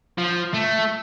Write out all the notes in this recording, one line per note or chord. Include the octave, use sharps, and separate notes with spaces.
F3
A3